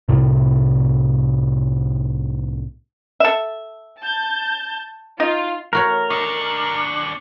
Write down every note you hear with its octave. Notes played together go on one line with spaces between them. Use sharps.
C2 A2 C3
A4 E5
A5 G6
D#4 F4
A3 F#4 A#4 C#5
D#2 D4 D#5 C#6